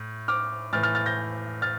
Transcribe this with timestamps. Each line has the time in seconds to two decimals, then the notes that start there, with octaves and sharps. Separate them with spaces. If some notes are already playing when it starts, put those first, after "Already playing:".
Already playing: A2
0.28 D6 F6
0.73 A2 E3 F6 A6
0.83 F6 A6
0.95 F6 A6
1.06 G6 A#6
1.62 F6 A6